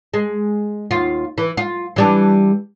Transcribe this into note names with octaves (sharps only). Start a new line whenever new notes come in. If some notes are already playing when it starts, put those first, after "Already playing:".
G#3
D#2 F4
E3
F4
E3 G3 D4